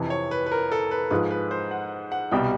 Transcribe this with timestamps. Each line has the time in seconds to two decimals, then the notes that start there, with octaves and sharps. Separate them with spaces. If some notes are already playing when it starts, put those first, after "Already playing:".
Already playing: F2 C3 E3
0.10 C#5
0.31 B4
0.46 B4
0.52 A#4
0.72 A4
0.91 B4
1.11 G#2 F3 G#3 B4
1.31 B4
1.51 C5
1.71 F#5
2.12 F#5
2.31 C2 B2 G3 G5